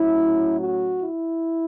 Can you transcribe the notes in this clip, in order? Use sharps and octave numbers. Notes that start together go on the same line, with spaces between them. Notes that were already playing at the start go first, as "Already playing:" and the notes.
Already playing: A2 F#3 C#4 E4
F#4
E4